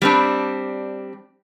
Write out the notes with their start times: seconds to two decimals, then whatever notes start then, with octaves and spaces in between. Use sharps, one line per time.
0.02 G3 C4 D4